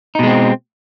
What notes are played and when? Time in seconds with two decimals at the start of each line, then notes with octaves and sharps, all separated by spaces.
0.15 D#4
0.19 B2
0.23 G#3
0.27 C4